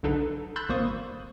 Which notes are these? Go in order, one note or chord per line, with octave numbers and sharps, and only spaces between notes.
B1 D3 D4 D#4 A4 B4
B5 C6 E6 F#6 G6 A6
G#1 G3 A#3 C5 C#6 D#6